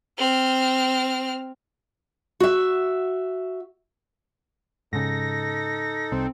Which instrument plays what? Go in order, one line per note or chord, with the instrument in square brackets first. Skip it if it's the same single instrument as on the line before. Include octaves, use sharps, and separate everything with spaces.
[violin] C4 F6
[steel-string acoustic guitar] F#4 E5
[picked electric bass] G#2 C#3 [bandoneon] D#4 A4 [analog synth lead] A#6
[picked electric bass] C2 [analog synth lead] C4